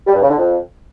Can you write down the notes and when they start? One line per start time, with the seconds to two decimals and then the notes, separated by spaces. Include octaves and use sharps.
0.07 G3
0.15 G2
0.22 C#3
0.30 D3
0.38 F2